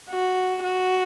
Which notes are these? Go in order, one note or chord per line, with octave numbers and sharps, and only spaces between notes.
F#4
F#4